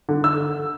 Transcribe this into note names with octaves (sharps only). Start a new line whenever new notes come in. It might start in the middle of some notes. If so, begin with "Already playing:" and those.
D3
E6